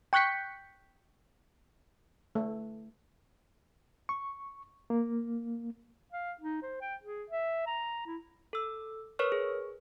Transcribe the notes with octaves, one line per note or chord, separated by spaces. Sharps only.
G5 C#6 F#6 G6 B6 C#7
A3
C#6
A#3
F5
D#4
C5
G5
G#4
E5
A#5
E4
A4 E6
A#4 B4 C#5 C#6 F6
G#4